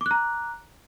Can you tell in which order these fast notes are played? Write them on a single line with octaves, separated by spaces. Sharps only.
D6 F#6 A#5